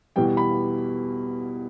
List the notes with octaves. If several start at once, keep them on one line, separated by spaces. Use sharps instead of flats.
E2 B2 G3 G5
B5